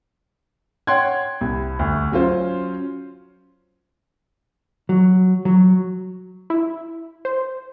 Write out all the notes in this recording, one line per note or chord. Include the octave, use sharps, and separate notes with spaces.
C#5 F#5 G5 C6 F#6 G#6
C2
D2
F#3 C#4 F4 C5
F#3
F#3
E4
C5